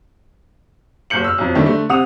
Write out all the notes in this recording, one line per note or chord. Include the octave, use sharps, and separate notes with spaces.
F#1 B1 G6 C#7 F#7
E6 F6
B1 F2
D#3 G3 A3 D4 E4
D3 A3
C3 F#5 D#6 F7